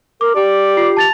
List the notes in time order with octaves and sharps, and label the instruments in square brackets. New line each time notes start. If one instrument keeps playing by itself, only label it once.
[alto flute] A#4 [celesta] D6
[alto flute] G4 [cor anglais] D5
[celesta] F4 C7
A5 A6 F7